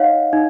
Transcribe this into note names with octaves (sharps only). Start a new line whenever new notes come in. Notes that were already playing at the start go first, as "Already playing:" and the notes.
Already playing: D#4 C#5 D#5 F5 F#5
D#4